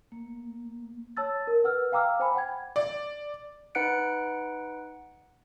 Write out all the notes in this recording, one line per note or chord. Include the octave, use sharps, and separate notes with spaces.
A#3
C#5 A5 E6 A6
A#4
B4 F#5 E6 F6
F5 G5 A#5 D6 E6 F6
C5 G#5 B5
F#5 G5 G#6
D5
D#4 B4 F#5 F#6 C#7 D7